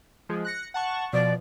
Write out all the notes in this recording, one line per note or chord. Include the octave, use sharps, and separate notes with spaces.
F3 G#3
F#6 A#6 C#7
F#5 A5 C#6
B2 F3 D5